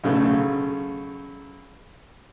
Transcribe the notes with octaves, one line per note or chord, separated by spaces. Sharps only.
B1 C#3 A3